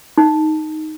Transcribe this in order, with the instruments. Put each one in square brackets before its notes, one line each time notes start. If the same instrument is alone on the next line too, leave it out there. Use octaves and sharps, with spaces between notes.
[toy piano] D#4